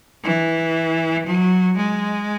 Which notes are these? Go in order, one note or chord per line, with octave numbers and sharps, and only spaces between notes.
E3
F#3
G#3